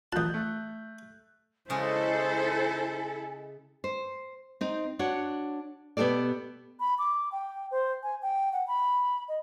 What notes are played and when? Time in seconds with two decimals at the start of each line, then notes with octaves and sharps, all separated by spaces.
0.13 A1 F3 A5 D#6 F#6 G6
0.34 A3
1.70 C#3 G#3 E4 A4 C5 G#5
3.84 C5
4.61 C4 D#4
4.99 D4 F#4 C#5 F#5
5.97 B2 B3 D#4 G4 A4 D5
6.80 B5
6.99 D6
7.32 G5
7.71 C5
8.03 G#5
8.22 G5
8.53 F#5
8.68 B5
9.28 D#5